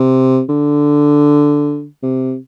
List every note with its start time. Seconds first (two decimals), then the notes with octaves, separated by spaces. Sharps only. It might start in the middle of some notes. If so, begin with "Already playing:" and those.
Already playing: C3
0.49 D3
2.03 C3